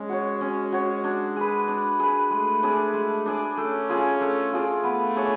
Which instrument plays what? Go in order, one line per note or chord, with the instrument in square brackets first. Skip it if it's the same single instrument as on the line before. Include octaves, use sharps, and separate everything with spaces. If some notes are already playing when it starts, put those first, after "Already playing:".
Already playing: [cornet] G#3 [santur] C#4
[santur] F#4 C#5
C#4
F#4 C#5
D4
G#4 B4
D4
G#4 B4
[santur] G#3 [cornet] A3
[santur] D4 G#4 D5
G#3
D4 G#4 D5
[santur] A3 [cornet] C#4
[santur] F4 G#4 D5
A3
F4 G#4 D5
[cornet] A3 [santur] B3
[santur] D4 G#4 C#5